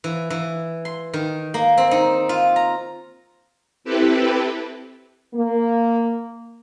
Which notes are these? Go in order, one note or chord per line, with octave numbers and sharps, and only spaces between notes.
E3
E3
C6
D#3
A#3
C4
D#4
F4
A#5
C4 E4 G4 A4 B4
A#3